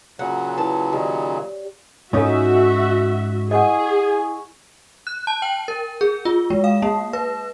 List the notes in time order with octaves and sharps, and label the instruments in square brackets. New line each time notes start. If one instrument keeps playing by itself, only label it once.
[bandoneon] A#2 C#3 F#3 [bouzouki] F#5
[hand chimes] E4 A#4 B4 [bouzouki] A5
[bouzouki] D#3 [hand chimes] G4 C#5 D5
[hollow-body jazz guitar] G#2 C#4 D#4 [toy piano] F4 A4 [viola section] F#4 E5
[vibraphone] E4 G#5 C#6 [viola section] G#4 [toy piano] D#5 F#5
[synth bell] F#6
A5
G5
A#4
G#4
F4
G#3
F5
A#3
B4